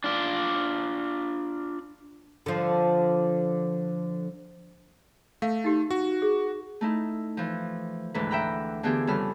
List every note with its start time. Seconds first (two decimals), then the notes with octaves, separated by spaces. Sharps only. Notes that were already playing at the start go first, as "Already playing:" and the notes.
0.04 D4 F4 D5
2.46 D3 F3
5.42 A3 F5
5.64 D#4 G4
5.91 F#4
6.22 G#4
6.81 A3 D#4 E4
7.37 E3 F3
8.14 D2 G#2 E3 B4
8.31 E5 F#5 G5 A#5 B5
8.83 D3 E3 B3 F4 G4 G#4
9.07 F2 C#3 G3 A4 B5 F6